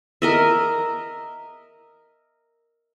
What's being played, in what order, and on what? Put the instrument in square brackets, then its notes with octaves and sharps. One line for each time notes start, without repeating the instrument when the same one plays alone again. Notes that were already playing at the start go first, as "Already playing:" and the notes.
[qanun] A#4 D#5 E5